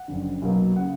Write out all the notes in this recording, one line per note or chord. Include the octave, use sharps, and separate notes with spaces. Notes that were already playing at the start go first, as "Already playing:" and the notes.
Already playing: F#5
F#1 F2 D3
B1 B2 F#3 A#3
C#3 F#5